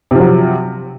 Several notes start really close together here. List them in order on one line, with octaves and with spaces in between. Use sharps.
C3 F3 F#3